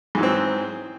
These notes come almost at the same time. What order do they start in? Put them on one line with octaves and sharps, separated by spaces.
G#2 E3 F#3 C4